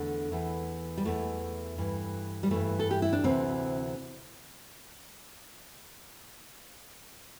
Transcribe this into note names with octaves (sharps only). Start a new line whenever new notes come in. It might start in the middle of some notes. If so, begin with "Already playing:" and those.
Already playing: E2 D3 A3
E2 E3
G3
E2 E3 A3
G2 E3
G3
G2 E3 A3
A4
G4
E4
D4
D2 C3 E3 C4